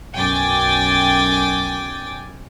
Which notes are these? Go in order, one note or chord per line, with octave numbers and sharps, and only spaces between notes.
B1 F#2 G5 G#5 D6 A6